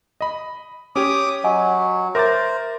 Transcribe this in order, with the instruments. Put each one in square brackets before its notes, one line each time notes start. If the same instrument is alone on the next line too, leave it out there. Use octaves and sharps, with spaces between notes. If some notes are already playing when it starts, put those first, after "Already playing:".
[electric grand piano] D#5 B5
[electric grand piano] C#4 G4 C#5 [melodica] D6 D#6
[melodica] F#3 [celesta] D#5 F#5 G#5
[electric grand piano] A#4 D6 A6 [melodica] C5 [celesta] E5 A#6